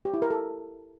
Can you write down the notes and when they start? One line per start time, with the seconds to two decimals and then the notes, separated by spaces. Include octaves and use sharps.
0.05 G4
0.14 E4
0.22 A#4
0.30 A4